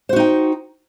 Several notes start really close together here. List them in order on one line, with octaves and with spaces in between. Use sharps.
C5 F#4 D#4 G5